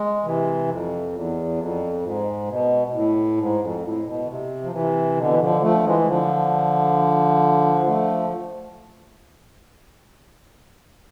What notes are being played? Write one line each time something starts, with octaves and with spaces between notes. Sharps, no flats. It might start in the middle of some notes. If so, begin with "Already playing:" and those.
Already playing: G#3
C3 E3
F2
E2
F2
G#2
B2
B2
A2
G#2
F2
A2
B2
D3
C3
F3
C3 E3
B2 D3
E3
D3 F3
F3 A3
E3 G#3
G#3
D3 F3
F3 A3